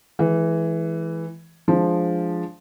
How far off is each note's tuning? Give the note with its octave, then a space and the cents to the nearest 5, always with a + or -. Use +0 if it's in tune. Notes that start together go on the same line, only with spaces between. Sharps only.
E3 +0 G#3 +35
F3 +0 G#3 +10 D4 +0